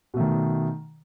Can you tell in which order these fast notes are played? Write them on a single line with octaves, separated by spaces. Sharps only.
B2 A3 D#3